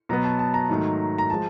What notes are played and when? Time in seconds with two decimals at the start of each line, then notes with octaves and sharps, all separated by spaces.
0.09 B2 F#3 B3 A#5
0.24 A5
0.39 A5
0.54 A#5
0.70 G#2 D#3 F#3 A3
1.18 A#5
1.30 F3 G#3 A5